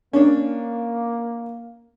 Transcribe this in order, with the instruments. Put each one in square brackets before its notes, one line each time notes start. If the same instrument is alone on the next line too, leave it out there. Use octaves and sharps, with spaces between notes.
[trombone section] A#3 [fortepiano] C#4 D4